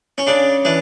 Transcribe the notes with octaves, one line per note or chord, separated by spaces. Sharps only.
C#4
C#3 D4
E3 D4